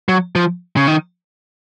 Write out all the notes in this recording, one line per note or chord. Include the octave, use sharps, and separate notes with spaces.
F#3
F3
C#3
D#3